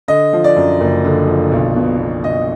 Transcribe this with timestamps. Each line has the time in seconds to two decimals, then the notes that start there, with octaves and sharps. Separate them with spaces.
0.08 D3 D#5
0.33 F3
0.44 D5
0.56 F#2
0.81 F#1
1.05 D3
1.27 F3
1.52 B1
1.76 B2
2.00 B2
2.24 B1 D#5